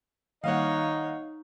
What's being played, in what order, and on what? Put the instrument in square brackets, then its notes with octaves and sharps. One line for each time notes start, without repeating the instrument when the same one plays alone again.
[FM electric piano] D#3 G3 A#3 [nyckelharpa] D#4 C#5 [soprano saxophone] D#5 [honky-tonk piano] F5 F#5